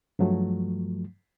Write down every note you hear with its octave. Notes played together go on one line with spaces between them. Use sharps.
G2 F3 F#3 A3